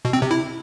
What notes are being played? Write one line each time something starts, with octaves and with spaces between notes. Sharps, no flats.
B2
C4
C3
E4